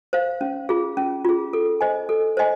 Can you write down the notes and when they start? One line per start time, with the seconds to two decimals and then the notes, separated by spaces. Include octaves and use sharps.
0.13 C5 F5
0.41 C#4
0.69 F4 G#4
0.97 C#4
1.25 F4 G#4
1.53 A4
1.81 C5 D#5 G#5
2.09 A4
2.37 C5 D#5 G#5